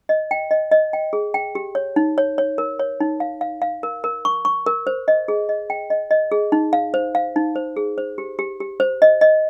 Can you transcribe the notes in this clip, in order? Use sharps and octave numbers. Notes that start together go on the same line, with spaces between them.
D#5
G5
D#5
D#5
G5
G#4
G5
G4
C#5
D#4
C#5
C#5
A#4
C#5
D#4
F5
F5
F5
A#4
A#4
C#6
C#6
A#4
C5
D#5
G#4
D#5
G5
D#5
D#5
G#4
D#4
F5
C5
F5
D#4
C5
G#4
C5
G4
G4
G4
C5
D#5
D#5